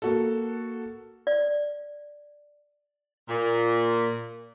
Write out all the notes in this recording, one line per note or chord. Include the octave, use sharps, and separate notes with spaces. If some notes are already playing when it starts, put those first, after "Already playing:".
A#3 F#4 A4
D5
A#2